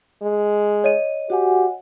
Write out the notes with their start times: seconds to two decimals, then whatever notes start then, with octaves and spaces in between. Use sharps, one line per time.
0.22 G#3
0.84 C#5 D#5 D#7
1.30 F#4 G4 F#5 G#5